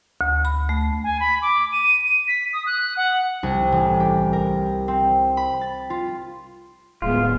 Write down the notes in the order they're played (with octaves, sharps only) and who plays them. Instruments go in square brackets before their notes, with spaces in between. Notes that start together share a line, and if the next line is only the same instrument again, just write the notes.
[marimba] D2
B5
A3
[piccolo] G#5
B5
D6
D#7
D#7
B6
D#6
F#6
F#5
[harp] C2
A1
G4
A#4
C4
B5
A6
F4
[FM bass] D1 [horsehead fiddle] G#3 B3 [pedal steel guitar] F4